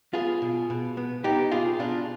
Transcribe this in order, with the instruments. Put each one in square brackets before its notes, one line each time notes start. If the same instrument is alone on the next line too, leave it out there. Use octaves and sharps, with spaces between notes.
[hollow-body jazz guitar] B3 F4 G#4
B2
B2
B3
B3 D#4 G4
B2 F4 G#4
B2 D4 F4